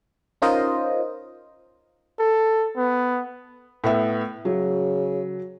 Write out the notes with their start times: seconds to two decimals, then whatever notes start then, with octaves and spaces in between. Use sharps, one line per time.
0.42 C#4 D#4 F4 A#4 C5 D#5
2.19 A4
2.77 B3
3.84 A2 B3 E5
4.45 C#3 F#3